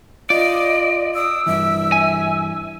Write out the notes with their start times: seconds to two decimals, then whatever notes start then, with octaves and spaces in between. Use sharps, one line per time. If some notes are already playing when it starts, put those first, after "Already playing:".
0.30 F4 D5 D#5
1.15 D#6 E6
1.46 G2 E3 E5
1.92 G#5